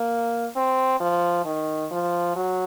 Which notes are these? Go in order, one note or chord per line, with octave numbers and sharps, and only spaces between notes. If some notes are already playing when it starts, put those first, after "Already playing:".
Already playing: A#3
C4
F3
D#3
F3
F#3